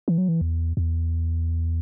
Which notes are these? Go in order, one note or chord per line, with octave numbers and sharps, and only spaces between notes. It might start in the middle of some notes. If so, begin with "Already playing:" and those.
E3
F#3
E3
E2
E2